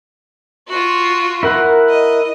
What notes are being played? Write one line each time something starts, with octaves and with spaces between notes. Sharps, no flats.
F4 F#4
E4 A#4 F#5
D#5